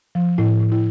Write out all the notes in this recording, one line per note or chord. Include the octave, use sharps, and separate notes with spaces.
F3
A2 E4
A2
E4